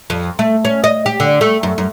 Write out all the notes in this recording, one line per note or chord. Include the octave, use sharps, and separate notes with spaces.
F2
A3
C#4
D#5
G4
D3
A3
F#2
F#2